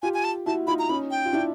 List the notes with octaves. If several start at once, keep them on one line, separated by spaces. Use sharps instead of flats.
F4 G4 G#5
G#5
A5
E4 F#4 A5
D#4 F4 B5
A#5
C#4 D#4 B5
G5
F4
D4 E4